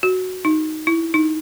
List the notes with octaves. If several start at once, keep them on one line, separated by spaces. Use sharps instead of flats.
F#4
D#4
E4
D#4